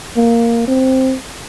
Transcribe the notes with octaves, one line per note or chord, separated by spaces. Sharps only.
A#3
C4